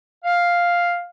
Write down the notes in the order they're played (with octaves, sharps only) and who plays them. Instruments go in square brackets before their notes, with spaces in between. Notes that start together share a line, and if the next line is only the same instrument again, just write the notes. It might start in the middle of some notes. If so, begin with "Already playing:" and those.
[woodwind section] F5